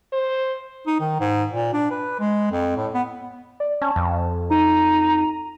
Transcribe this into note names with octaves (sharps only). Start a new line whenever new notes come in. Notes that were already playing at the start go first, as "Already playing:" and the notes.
C5
D#4
D#3
G#2
A#2
D4
B4
G#3
F2
A2
B3
D5
C#4 A5
F2
D#4 A#5 D#7